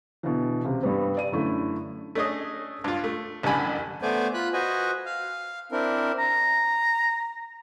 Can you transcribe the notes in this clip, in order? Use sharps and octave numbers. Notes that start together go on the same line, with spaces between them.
B2 D3 E3
C#2 C3
G2 G3 B3
D5 D#7
F#2 D3 A3 E4
A3 C#4 D4 G#4 D#5
G2 F4
A3
A1 F#2 D3 G3 G#5 B5
A3 B3 C5 D5 G#5
F4 B5 F#6
F#4 B4 C5 D#5 G#5
F5
C4 D4 E4 A#4
A#5